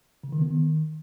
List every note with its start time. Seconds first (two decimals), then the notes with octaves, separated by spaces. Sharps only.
0.23 C#3
0.32 D#3
0.41 B3
0.50 D#3